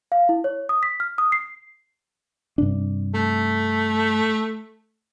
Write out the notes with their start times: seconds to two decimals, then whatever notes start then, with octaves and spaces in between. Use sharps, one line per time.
0.12 F5
0.29 E4
0.44 C#5
0.69 D#6
0.83 B6
1.00 F6
1.18 D#6
1.32 C7
2.58 G2 C3 D4
3.14 A3